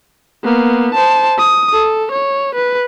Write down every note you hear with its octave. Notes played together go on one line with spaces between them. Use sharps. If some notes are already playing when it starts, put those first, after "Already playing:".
A#3 B3
C5 A5
D#6
A4
C#5
B4